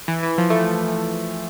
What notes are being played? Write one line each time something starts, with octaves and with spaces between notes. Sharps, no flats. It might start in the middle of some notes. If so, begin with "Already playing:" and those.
E3
E3
F3
A3